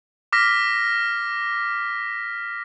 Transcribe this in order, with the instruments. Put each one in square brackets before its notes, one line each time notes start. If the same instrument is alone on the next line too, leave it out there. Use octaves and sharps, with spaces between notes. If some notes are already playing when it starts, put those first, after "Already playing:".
[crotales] D6 F6 A#6 B6